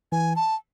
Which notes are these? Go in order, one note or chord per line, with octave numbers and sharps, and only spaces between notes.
E3 G#5
A5